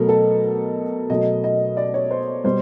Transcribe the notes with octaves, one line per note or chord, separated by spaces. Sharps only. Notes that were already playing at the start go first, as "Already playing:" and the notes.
Already playing: B2 F#3 A3 A#4
A4
B2 F#3 A3 D#5
D#5
D5
C#5
C5
B2 G3 C5